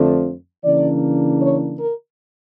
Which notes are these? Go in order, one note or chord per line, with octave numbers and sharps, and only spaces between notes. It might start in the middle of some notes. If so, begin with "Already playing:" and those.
Already playing: F2 D3 F3 A3 D4
C#3 E3 A#3 D4 D5
C#5
A#4